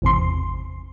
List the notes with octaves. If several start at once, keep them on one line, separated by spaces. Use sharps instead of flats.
G#1 E2 C3 C6